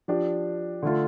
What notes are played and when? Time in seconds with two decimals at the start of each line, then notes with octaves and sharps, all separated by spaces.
0.08 F3 D4 G4
0.83 D3 A3 F4